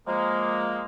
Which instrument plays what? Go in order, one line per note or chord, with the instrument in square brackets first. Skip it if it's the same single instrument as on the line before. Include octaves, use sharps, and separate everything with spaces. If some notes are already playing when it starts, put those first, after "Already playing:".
[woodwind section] F3 G#3 A#3